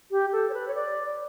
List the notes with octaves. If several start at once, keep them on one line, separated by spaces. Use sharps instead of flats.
G4
A4
C#5
B4
C#5
D5